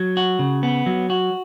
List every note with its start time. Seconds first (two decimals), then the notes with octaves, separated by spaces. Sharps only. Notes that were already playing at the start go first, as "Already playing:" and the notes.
Already playing: F#3
0.17 F#4
0.39 C#3
0.63 B3
0.86 F#3
1.10 F#4